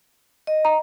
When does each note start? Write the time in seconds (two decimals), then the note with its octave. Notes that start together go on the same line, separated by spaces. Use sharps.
0.47 D#5
0.65 A#5